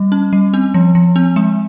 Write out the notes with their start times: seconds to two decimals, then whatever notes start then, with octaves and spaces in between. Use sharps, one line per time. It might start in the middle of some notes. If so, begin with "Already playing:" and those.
Already playing: G3
0.12 C#4
0.33 G3
0.54 C4
0.74 F3
0.95 F3
1.16 C4
1.36 G#3